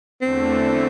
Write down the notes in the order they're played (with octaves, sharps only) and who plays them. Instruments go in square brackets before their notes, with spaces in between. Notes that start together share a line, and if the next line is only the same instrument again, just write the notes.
[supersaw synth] E2 D3 A3 [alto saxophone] C4